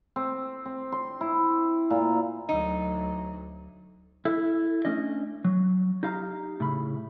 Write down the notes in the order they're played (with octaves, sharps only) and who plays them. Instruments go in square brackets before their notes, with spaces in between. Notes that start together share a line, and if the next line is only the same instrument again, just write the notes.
[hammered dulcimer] C4
C4
C6
E4
A#2
[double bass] D2 F#3 [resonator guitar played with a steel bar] D#4
[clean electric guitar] E4 A4
A3 C#4 D4 D#5
F#3
D#4 G4 F5 A#5
A2 C#3 B5